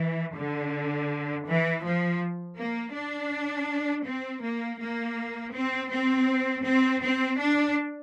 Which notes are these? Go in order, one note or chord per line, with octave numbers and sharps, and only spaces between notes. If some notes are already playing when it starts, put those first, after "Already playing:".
Already playing: E3
D3
E3
F3
A#3
D4
C4
A#3
A#3
C4
C4
C4
C4
D4